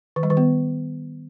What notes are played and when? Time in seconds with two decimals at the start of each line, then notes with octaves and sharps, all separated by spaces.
0.16 D#3
0.23 G3
0.30 D#3
0.37 B3